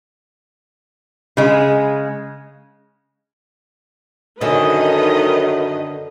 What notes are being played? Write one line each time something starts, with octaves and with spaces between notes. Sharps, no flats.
C#3 G#3
F#2 D3 D#3 C#4 B4 D#5